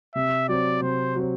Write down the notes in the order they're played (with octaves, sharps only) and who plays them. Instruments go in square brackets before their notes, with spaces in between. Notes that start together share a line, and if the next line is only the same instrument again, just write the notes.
[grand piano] C3 [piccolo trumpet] E5
[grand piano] F#3 C4 [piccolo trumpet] D5
[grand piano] C3 [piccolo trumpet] C5
[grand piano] F#3 C4